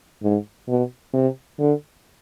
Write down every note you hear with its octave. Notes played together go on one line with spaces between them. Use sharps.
G#2
B2
C3
D3